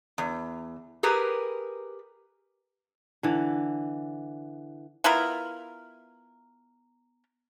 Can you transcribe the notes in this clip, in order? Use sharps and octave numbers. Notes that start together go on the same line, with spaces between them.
E2
G4 G#4 A#4 B4
D3 E3
B3 E4 F4 A#4